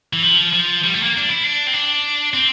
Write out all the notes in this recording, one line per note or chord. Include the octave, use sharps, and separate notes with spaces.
E3
F3
F3
G3
A3
A#3
D4
E4
D4
C4
D4
C4